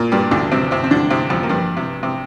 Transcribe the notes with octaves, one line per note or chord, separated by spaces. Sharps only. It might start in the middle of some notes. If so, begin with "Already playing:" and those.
Already playing: A#2 A#3
G2 G3
D2 D3
C3 C4
C3 C4
C4
D3 D4
C3 C4
F2 F3
A#3
G2 G3
C3
C3